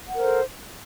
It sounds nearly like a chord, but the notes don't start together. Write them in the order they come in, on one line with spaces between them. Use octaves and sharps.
F#5 A#4 C5 A4